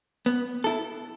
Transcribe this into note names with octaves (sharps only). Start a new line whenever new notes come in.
B3
E4 A4